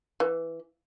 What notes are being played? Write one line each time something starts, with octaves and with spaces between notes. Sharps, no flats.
E3